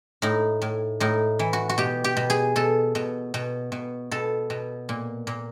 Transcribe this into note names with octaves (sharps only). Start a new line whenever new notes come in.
A2 D#4
A2
A2 D#4
E3
F#4
F#4
B2 G4
G4
B2
G#4
B2 A4
B2
B2
B2
B2 A4
B2
A#2
A#2